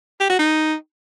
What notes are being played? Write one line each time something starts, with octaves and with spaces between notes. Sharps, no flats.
G4
F#4
D#4